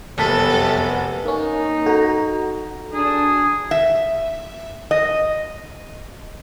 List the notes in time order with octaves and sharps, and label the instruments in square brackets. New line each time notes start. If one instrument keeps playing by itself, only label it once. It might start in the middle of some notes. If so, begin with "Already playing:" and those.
[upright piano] F1 A5 B6 [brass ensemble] F#2 G3 B3 [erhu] A4
[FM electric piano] A#3 C#4 [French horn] D#4
[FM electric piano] F#4 A#5 [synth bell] A4
[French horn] D4 [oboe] G#4
[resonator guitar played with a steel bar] E5
D#5